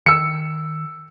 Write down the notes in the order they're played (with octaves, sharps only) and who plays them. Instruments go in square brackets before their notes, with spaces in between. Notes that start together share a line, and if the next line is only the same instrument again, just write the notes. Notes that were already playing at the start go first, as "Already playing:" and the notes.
[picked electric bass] D#3 [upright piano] E6 C#7